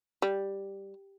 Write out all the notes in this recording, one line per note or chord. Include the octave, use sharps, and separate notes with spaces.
G3